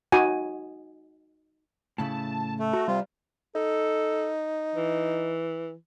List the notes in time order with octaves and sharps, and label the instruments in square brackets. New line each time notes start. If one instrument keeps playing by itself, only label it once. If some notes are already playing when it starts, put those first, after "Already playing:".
[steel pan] D#4 F#4 G#5
[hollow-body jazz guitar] A2 C#3 E4 [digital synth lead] A5
[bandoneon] A3
[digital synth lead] F#4 [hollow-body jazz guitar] A#5
[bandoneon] C3 F4 [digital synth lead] G3
[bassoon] D#4 [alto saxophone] A4
[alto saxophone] E3